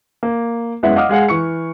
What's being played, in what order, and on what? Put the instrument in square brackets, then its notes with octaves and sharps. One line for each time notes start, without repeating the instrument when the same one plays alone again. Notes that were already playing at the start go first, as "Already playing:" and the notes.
[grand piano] A#3
F#2 G#3 B3 E4 E5 F#5
D#5 F5 F#5 D6 D#6 F6
G#3 G#4 F5 F#5
E3 C#6 C#7